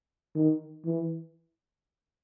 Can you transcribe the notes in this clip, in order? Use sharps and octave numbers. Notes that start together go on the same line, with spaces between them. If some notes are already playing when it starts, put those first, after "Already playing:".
D#3
E3